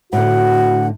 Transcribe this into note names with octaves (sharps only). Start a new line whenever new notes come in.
A2 D3 F#4 F#5